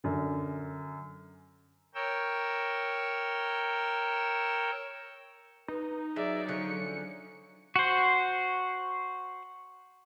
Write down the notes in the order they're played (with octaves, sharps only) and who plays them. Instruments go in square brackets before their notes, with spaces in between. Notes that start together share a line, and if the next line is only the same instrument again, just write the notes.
[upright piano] F#2 D3
[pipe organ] A#4 C#5 G5 E6
[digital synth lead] D#4 [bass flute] B4
[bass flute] F#3 [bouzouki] G#3 [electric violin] D5 E5
[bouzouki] D3 F3 C#4 [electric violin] C#7
[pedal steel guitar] F#4 C5